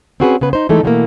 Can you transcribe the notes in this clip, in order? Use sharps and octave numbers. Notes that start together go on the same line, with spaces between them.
C4 C#4 F#4 G#4 A#4 B4
C#3 B3 B4
D#4 C5
E3 G#3 A3 D#4 A4
B2 E3 F3 G3 A3 A#3